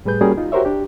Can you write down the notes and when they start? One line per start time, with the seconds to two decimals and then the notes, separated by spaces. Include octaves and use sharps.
0.05 A2 G3 G#4 B4 G6
0.21 G3 A#3 C#4 F#4 G#4 A#4
0.37 D#4 F4
0.52 F#4 G4 A#4 C5 C#5 E5
0.65 D4 G4